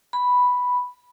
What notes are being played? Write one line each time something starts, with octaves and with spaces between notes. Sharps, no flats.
B5